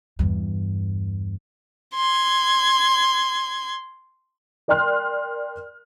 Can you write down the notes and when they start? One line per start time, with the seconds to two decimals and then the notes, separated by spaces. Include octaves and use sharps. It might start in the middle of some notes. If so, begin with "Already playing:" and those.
0.19 E2 G2
1.95 C6 G#6
4.68 A#4 D5 G5 C6 F6 F#6